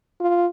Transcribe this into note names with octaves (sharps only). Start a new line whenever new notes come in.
F4